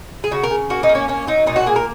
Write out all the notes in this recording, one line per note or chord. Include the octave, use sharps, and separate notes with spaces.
G#4
C#3 F#4
A#4
C#3
A#3 F#4
D#4
A#3
C#4
A#3 C#4
F#3 D#4
A#2 D#4
F#4
A#3 G#4
A#4